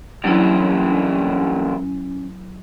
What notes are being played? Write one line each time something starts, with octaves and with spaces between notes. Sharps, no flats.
G2 E3 F#3 C#4 E4